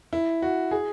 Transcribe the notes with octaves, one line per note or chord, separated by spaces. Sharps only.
E4
F#4
G#4